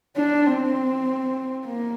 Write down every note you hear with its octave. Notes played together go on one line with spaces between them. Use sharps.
D4
C4
A#3